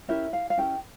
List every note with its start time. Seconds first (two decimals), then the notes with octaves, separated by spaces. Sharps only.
0.08 C#4 E4 G4 A#4 E5
0.33 F5
0.50 F5
0.57 C#4 E4 G4 A#4 G5